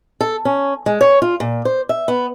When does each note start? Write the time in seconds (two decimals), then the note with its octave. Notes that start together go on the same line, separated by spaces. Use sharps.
0.20 A4
0.45 C#4
0.86 G#3
1.01 C#5
1.22 F4
1.40 A#2
1.65 C5
1.89 E5
2.08 B3